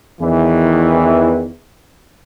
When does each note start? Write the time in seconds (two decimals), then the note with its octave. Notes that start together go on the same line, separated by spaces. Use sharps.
0.22 E2 D#3 E3